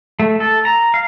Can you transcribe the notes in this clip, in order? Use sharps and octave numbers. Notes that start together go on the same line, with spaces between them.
A3
A4
A#5
F5